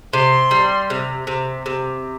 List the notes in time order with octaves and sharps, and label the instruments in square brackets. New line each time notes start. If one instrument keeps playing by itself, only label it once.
[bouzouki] C3 [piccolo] C6
[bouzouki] G3
C3
C3
C3